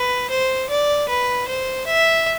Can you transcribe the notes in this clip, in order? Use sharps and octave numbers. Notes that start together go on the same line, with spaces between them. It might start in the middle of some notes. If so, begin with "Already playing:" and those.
Already playing: B4
C5
D5
B4
C5
E5